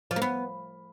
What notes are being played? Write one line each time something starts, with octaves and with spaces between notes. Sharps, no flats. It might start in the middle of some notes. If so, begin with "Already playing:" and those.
F3
A#3
B3